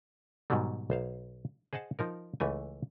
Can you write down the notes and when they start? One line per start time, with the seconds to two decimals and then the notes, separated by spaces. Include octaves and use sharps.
0.50 G#2 B2 D#3 F#3 G3
0.90 B1 C5 F5
1.73 G#4 C5 D#5 F#5 A5
1.99 F3 D#4 A#4
2.40 C#2 E3 A3 G#5